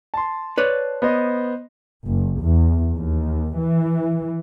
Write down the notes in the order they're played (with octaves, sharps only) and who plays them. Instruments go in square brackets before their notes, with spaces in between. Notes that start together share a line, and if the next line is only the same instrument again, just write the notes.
[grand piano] A5 C6
[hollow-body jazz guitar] B4 C#5 D5
[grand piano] B3 C5 D#5
[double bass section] F#1
E2
D#2
E3